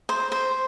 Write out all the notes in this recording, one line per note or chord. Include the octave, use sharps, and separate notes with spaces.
C5
C5